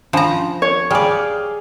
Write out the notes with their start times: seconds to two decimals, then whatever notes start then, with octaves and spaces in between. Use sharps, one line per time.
0.13 F3 C#4 D4 F4 A#5
0.62 C#5
0.91 G3 G#4 D5 F5 G5